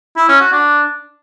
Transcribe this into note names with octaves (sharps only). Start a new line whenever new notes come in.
E4
C#4
F#4
D4